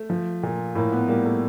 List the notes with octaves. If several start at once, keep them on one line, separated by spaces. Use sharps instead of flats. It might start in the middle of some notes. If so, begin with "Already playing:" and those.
Already playing: A3
F3
A#2
A2 A#3
B3
G3 A#3
A3